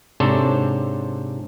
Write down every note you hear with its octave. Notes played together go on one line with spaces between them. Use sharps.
G#2 C3 D4 A4 C5 C#5